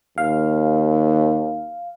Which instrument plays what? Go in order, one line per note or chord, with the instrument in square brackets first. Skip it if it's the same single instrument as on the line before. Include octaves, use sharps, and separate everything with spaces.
[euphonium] D#2 [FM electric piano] F5